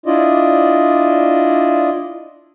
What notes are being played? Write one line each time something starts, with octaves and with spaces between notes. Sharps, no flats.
D4 E4 F4 D5 D#5